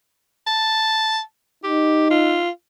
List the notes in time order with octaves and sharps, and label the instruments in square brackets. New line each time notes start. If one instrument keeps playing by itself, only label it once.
[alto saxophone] A5
[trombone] D#4 [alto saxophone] G4
[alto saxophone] F4